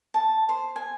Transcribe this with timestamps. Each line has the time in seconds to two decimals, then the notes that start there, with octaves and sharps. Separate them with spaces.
0.14 A5
0.49 C5
0.76 G#5